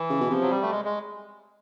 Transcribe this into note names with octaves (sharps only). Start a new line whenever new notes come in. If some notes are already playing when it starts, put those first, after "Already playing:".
Already playing: E3
C#3
B2
C3 F3
F#3
G3
A3
G#3
G#3